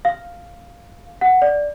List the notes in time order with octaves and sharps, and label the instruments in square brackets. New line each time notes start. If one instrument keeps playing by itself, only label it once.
[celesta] F5
F#5
D5